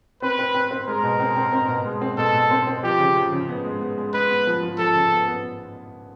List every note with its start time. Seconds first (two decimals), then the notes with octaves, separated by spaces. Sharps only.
0.22 C4 B4
0.39 C4
0.54 C4
0.71 C4
0.87 G#3 A#4
1.03 B2
1.20 C4
1.36 C4
1.53 C4
1.68 B2
1.85 G#3
2.02 C4
2.18 B2 A4
2.34 B2
2.51 C4
2.67 C4
2.83 F3 G4
2.99 C#3
3.16 F3
3.32 C#3
3.49 B3
3.64 G#3
3.81 B3
3.98 G#3
4.14 G#3 B4
4.31 B3
4.47 F3
4.63 F3
4.79 F3 A4
4.95 C#3
5.12 B3
5.28 B3